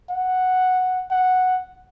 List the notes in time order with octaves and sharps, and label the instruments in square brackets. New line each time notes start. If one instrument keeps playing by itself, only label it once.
[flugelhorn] F#5
F#5